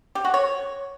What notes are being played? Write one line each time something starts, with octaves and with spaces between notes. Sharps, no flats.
G4
F#4
C#5